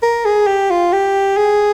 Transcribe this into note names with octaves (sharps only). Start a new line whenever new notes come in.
A#4
G#4
G4
F4
G4
G#4